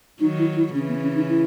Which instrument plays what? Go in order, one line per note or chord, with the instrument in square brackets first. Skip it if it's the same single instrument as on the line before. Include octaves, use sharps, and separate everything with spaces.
[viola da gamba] D#3 F#3 [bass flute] D#4
[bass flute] E4
E4
[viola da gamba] C#3 E3 [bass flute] C#4
[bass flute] B3
C#4
D#4
E4